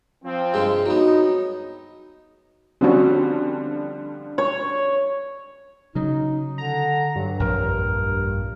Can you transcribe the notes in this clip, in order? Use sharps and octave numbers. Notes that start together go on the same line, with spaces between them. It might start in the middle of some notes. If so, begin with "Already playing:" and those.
F3 C4
G2 C3 G#3
F#3 B3 D#4
D3 F3 G3 C4 C#4 F#4
C#5
C#3 F#3 D#4
D3 A#5
G2 F#3
A#1 F2 A#2 A#4